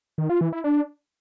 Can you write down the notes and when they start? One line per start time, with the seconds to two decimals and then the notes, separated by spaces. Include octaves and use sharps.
0.18 D#3
0.29 F4
0.41 E3
0.53 E4
0.64 D4